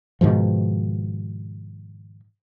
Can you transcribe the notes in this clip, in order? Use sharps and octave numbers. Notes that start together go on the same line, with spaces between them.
G#2 B2 D#3 F3